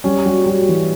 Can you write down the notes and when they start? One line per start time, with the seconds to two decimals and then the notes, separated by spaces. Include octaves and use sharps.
0.04 G3 C#4
0.25 G3 F#4
0.46 G3 F#4
0.69 E3